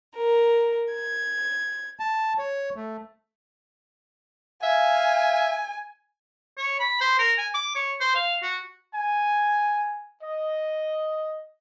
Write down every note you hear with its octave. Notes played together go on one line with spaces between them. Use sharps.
A#4
G#6
A5
C#5
A3
E5 F5 G#5
C#5
B5
C5
A#4
G#5
D6
C#5
C5
F5
F#4
G#5
D#5